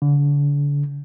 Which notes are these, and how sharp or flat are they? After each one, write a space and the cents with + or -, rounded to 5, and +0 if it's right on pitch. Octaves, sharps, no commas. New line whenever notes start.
D3 -35